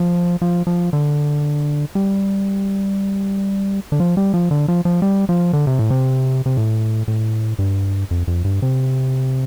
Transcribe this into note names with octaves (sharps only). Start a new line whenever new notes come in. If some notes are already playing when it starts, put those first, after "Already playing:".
Already playing: F3
F3
F3
D3
G3
D3
F3
G3
F3
D3
F3
F3
G3
F3
D3
C3
A2
C3
C3
A2
A2
G2
F2
F2
G2
C3